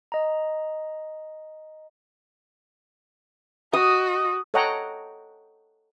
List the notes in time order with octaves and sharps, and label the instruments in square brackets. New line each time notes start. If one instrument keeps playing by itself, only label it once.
[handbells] D#5 A#5
[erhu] F#4 [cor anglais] D#5 [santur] D#6
[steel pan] A4 C#5 D#5 F#5 G5 A#5